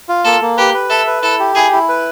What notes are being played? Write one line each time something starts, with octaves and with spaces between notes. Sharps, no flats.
F4
A#3 A4
A#3
G4 B4
B4
A4 E5
B4
E4 A4
G4
E4 G#4
E4
B4